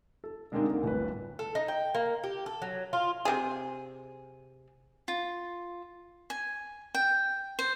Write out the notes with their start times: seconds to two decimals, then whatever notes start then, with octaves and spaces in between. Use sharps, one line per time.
0.24 A4
0.52 D3 G#3 A#3 C4 D4 D#4
0.71 D2 A#3
0.83 D1 G1 B4
1.39 A4
1.55 D#4
1.68 G5
1.95 A#3
2.24 G4
2.46 A4
2.62 F#3
2.93 F4
3.25 C3 G#4
5.08 F4
6.30 G#5
6.95 G5
7.59 C5